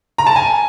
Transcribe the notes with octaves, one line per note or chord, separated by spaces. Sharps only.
A#5
A5
G#5